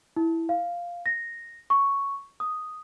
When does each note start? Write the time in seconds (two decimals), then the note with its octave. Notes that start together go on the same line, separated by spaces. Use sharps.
0.17 E4
0.49 F5
1.06 A#6
1.70 C#6
2.40 D#6